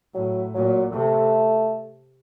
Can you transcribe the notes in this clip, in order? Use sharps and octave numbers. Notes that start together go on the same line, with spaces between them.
A2 F#3
A#2 F#3
C3 A3